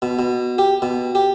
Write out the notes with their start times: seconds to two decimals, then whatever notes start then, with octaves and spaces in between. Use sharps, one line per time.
0.02 B2
0.19 B2
0.58 G4
0.82 B2
1.15 G4